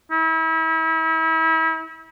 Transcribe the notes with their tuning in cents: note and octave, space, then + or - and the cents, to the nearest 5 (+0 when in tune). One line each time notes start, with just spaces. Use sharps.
E4 -35